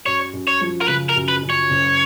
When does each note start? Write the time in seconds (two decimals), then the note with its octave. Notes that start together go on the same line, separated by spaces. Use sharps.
0.06 F#2 C#5
0.33 F#2
0.47 C#5
0.61 F3
0.81 A#4
0.88 C#3 B4
1.09 A#4
1.16 F#2
1.28 B4
1.43 F#2
1.50 C#5
1.70 F#1